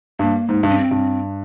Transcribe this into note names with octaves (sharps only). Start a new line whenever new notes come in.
G2 A#3
G#2
G2
C#4
C4
G2